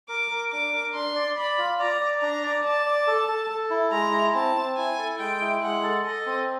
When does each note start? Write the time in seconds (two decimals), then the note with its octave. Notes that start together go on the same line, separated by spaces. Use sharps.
0.09 A#4 D6
0.31 A#4
0.52 D4 D6
0.73 A#4
0.94 D4 C6
1.15 D5
1.37 D5 B5
1.58 F4
1.79 D5 A#5
2.01 D5
2.21 D4 A#5
2.43 D5
2.64 D5 A5
2.86 D5
3.07 A4
3.28 A4
3.50 A4
3.70 E4
3.91 G#3 A#5
4.13 E4
4.35 C4 A5
4.56 C4
4.77 E4 G#5
4.98 A4
5.19 G#3 G5
5.41 E4
5.62 G#3 F#5
5.83 A4
6.05 A4 D#5
6.26 C4